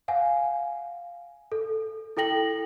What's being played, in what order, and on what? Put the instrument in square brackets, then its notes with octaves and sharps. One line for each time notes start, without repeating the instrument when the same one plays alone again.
[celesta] F5 F#5 G#5
A4
E4 A4 G5 A#6 F#7